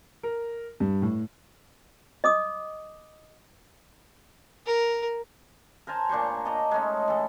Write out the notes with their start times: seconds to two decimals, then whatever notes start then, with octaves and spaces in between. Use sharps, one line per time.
0.23 A#4
0.80 G2
1.02 A2
2.24 D#5 D6 D#6
4.67 A#4
5.87 A#4 C5 G#5 A5
6.09 A#2 D4 C5 C#6
6.45 D#5 A5 A#5 D6
6.71 G#3 A3 C#4 D#4
7.08 E3 A4